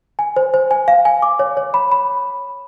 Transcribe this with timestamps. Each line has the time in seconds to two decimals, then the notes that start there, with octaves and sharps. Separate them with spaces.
0.19 G#5
0.36 C5
0.54 C5
0.71 G#5
0.88 F5
1.05 G#5
1.22 D6
1.39 C#5
1.57 C#5
1.74 B5
1.92 B5